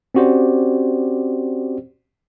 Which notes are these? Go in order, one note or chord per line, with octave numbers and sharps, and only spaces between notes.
C4 C#4 F#4 G4 C5 D5